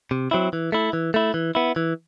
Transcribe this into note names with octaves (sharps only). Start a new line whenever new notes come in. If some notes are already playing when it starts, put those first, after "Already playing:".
C3
F#3 C4 E4
E3
A3 E4
E3
A3 E4
E3
B3 E4
E3